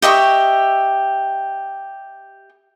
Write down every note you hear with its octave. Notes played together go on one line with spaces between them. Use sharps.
G4 D#5 E5 C#6